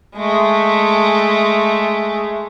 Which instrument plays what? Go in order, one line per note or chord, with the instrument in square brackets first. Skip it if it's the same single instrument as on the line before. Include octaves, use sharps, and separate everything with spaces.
[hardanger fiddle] G#3 A3